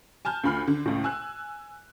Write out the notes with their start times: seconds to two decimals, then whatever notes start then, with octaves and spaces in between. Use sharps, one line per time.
0.25 G#5 A5 F6 G6
0.44 D2 F4 B5 F6 C7
0.67 D3
0.86 C#2 A2
1.04 G#5 E6 F#6